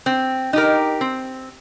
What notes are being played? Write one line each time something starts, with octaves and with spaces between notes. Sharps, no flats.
C4
D#4 G4 A#4
C4